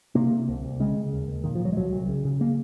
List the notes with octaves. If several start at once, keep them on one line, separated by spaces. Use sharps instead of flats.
C3 A#3
C3
C2
C2
C#3 G#3
C#3
D#2
D#2
A#2 D#3
F3
A#2
F#3
G#3
C2 F#3
C2
C#3
C#3
A#3